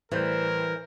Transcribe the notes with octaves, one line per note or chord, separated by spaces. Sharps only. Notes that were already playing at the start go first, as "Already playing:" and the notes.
A2 E3 G3 A#4 C5 G6